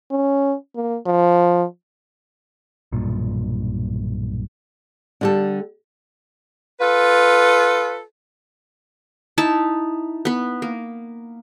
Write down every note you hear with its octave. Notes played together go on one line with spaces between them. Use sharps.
C#4
A#3
F3
B1 G2 A#2
D3 G3 A4
F4 A4 B4
D#4 E4 A5
B3 B4
A#3